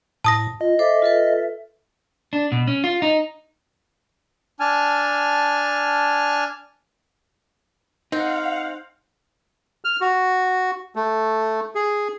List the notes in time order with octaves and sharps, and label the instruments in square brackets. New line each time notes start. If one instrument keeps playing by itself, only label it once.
[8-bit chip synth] A2 [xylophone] A5 D#6 A#6
[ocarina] F4 [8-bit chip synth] D#5
[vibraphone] A4 C5 D6 [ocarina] E5
[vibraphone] F4 A4 B4
[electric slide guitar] D4
B2
C#4
F4
D#4
[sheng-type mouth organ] D4 G#5 A5 F6
[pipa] C4 [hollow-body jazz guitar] D#4 [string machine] F5 F#5
[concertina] F6
F#4
A3
G#4